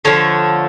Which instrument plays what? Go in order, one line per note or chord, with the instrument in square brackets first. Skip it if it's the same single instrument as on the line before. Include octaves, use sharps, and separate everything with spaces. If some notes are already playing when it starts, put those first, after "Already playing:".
[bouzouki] D3 F3 A3 C#5